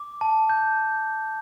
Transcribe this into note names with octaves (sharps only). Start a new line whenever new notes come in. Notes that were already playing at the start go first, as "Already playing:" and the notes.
Already playing: D6
A5
G6